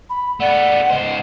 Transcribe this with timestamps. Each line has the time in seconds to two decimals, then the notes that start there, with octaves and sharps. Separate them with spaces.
0.10 B5
0.40 A3 B3 D5 F#5
0.90 C#2 C5 D#5